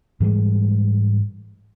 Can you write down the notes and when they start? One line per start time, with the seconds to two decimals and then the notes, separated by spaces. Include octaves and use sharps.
0.20 G#2 E3 G3 G#3